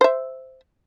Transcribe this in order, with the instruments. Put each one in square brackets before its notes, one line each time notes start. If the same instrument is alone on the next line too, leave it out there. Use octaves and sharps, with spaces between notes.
[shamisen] C5 E5